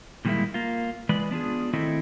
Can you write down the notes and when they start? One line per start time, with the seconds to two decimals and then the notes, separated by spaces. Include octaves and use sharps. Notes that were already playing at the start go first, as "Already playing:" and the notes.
0.25 A#2 D#3 G3 G#3 A#3 E4
0.54 A#3 F4
1.09 E3 G#3 B4 D5
1.31 B3 D4 F4 G#4
1.73 D#3 A3 C4 E4 A4 D#5